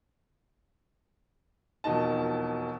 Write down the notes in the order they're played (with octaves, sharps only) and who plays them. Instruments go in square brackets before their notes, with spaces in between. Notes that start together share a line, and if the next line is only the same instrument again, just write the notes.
[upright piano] E1 F2 B2 D#3 D#4 A5